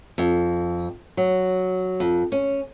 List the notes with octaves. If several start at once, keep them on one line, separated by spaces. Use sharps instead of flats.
F2
F#3
F2
C#4